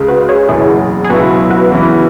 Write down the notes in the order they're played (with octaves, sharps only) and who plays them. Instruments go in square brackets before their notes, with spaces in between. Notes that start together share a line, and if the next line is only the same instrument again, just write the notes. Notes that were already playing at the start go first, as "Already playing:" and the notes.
Already playing: [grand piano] C#2 C#3 G#3
[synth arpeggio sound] F#4 B4
G#4 C#5
[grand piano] F#1 E2 B2 F#3 [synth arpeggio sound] E4 G#4
[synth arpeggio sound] G#4
[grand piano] C#2 B2 F#3 E4 [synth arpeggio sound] F#4 B4
[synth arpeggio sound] F#4 B4
[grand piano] E2 E3 C#4 E4